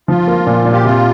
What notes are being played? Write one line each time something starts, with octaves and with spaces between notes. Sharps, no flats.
F3 F4
A#3
A#2
A#2
G4
C3 F4